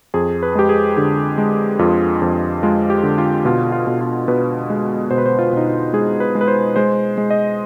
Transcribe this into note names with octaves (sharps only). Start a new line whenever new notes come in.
F2 G#4
B4
G#3 G4
G#4
D3 G4
G#3
F2 F4
F2
G#3 F4
G4
D3
F4
B2 F4
F4
B2
F4
B2 B4
G#3
B2 C5
B4
C5
F4
B2 D#4
F4
G#3 G#4
B4
G#3
B4
C5
G#3 C5
G#3
D#5